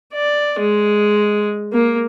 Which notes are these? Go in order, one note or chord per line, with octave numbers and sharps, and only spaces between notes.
D5
G#3
A#3